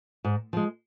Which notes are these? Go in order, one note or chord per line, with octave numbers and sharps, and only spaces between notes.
G#2
F3 G#3